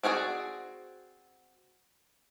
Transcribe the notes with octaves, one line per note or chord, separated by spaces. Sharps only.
C4 F#4 G#4 A4 D5